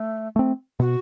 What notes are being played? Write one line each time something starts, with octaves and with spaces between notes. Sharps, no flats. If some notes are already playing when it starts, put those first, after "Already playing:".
Already playing: A3
A3 C4
B2 F#4